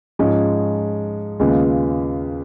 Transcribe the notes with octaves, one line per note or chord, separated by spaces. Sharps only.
G#2 F3 G#3 C#4
D#2 C#3 G#3 B3 F4